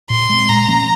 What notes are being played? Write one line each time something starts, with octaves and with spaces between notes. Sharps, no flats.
A#2 C6
G#3 C4
A#2 A#5
F3 A#3 C#4